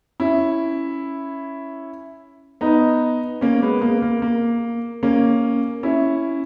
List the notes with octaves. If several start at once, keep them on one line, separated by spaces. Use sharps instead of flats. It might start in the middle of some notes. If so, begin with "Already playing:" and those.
C#4 E4
B3 D#4
A#3 C#4
G#3 B3
A#3
A#3
A#3
A#3 C#4
C#4 E4